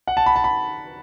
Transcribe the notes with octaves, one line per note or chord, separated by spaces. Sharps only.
F#5
A5
B5
A5
B5